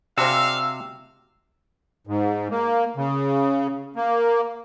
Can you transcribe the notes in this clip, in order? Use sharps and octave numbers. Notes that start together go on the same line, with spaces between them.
C3 G#3 C4 D4 F#4 F5 E6
G#2
A#3
C#3
A#3